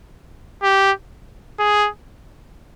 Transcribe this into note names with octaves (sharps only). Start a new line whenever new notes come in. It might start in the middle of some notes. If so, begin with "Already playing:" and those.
G4
G#4